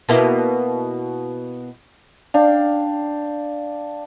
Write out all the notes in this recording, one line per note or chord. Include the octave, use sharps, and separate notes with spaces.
B2 A#3 E4
D4 F5 G5